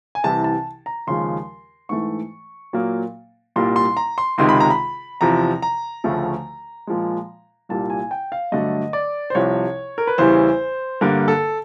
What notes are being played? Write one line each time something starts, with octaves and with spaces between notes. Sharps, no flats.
G#5
C2 C3 E3 A5
A5
A#5
D#2 C#3 F3 G#3 C6
G#2 E3 A3 C#6
A#2 F#3 A#3
C2 A#2 G3 A#3 C6
C6
A#5
C6
C#2 C3 D#3 G#3 C6
B5
A#5
B5
E2 C3 F3 A#5
A#5
D2 C#3 F3 A3
A#2 F3 G#3
C2 A#2 G3 A5
G#5
G5
F5
G2 D3 F#3 A3 D#5
D5
C5
C2 C3 F3 C#5
A#4
B4
E2 C#3 E3 G3 C5
G2 D3 G3 A#3 A#4
A4